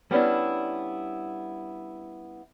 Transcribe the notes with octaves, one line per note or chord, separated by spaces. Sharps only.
G3 B3 C#4 D4 E4